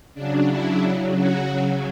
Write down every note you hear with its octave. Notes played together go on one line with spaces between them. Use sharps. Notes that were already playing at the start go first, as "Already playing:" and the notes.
C#3 F#3 D4
E4
C#3 F#3
F#4
C#3 F#3